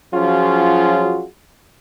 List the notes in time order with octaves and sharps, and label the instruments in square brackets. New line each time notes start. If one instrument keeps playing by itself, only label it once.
[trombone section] F3 F#3 C#4 F4 F#4 G#4